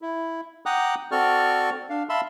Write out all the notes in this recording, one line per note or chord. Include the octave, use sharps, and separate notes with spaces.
E4
F#5 G5 A#5 D6 D#6 F#6
C4 F#4 A4 D5 C#6 F6
D4 F5
E5 F5 A5 B5 C6 E6